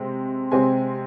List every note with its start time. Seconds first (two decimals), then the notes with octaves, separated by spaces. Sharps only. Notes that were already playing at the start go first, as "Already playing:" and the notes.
Already playing: C3 G#3 C4
0.52 C3 G#3 C4 G#5